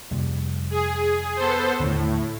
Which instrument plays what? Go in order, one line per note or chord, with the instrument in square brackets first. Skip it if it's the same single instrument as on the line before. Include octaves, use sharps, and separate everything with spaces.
[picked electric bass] F2 C3 G3
[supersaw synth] G#4
B3 A4 C5
[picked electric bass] D#2 D3 [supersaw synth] A2